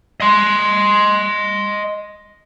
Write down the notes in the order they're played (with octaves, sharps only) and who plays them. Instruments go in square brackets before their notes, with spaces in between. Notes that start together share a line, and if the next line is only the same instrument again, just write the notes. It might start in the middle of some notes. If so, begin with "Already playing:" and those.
[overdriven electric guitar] D#5 C6